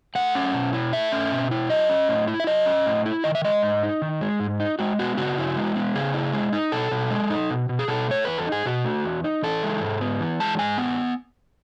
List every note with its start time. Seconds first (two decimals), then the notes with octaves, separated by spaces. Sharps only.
0.15 A3 F#5
0.35 C#4
0.54 B2
0.73 E4
0.93 A3 E5
1.12 C#4
1.32 B2
1.51 E4
1.69 F#3 D#5
1.89 C#4
2.09 A2
2.28 E4
2.40 E5
2.47 F#3 D#5
2.66 C#4
2.86 A2
3.06 E4
3.24 D#3 D#5
3.35 E5
3.44 G#3 D#5
3.63 G#2
3.83 D#4
4.02 D#3
4.21 G#3
4.40 G#2
4.60 D#4
4.79 G#3 F#4
4.99 B3 F#4
5.17 C#3 F#4
5.38 E4
5.56 G#3
5.75 B3
5.95 C#3 G#4
6.14 E4
6.33 G#3
6.53 D#4
6.72 B2 A4
6.91 B2
7.10 G#3
7.30 D#4
7.50 B2
7.69 B2
7.79 G#4
7.88 B2 A4
8.08 A3 C#5
8.25 E2 B4
8.38 A4
8.46 D#4
8.52 G#4
8.65 B2 F#4
8.85 A3
9.05 E2
9.24 D#4
9.43 E3 A4
9.63 G#3
9.81 G#2
10.01 B3
10.21 E3
10.40 G#3 A5
10.59 G#2 G#5
10.78 B3